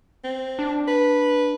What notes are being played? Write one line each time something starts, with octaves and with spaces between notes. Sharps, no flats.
C4
D4
B4